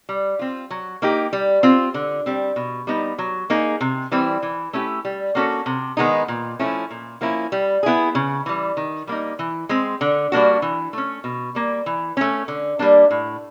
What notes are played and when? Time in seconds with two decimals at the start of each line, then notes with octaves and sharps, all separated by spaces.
0.09 G3
0.39 C4 F4
0.70 F#3
1.02 A#3 D#4 G4
1.33 G3
1.63 C4 F4
1.94 D3
2.26 G3 C4
2.56 B2
2.87 G3 B3 D#4
3.18 F#3
3.50 A#3 D#4 G#4
3.81 C3
4.12 E3 G3 C4
4.43 E3
4.73 A3 C#4 E4 G4
5.05 G3
5.35 A#3 C#4 F#4 A4
5.66 C3
5.97 D#3 G#3 B3 D#4
6.28 A#2
6.59 F3 A3 C#4 E4
6.91 A#2
7.21 F3 A#3 C#4 E4
7.52 G3
7.83 B3 E4 G#4
8.15 C#3
8.46 E3 G3
8.77 D#3
9.07 G3 A#3 D#4
9.39 E3
9.69 G#3 C4
10.01 D3
10.32 G3 A#3 D4 F#4
10.62 E3
10.93 A3 C#4
11.24 B2
11.55 G3 A#3
11.86 E3
12.17 A3 C#4
12.48 D3
12.79 G3 A#3 D4
13.11 A2